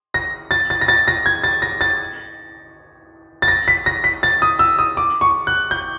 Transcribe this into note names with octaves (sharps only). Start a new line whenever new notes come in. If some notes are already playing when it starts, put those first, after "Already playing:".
A#6
A6
A6
A#6
A6
A#6
G#6
A6
A#6
A6
A6
A#6
B6
A#6
B6
A6
D#6
E6
D#6
D6
C#6
F#6
G6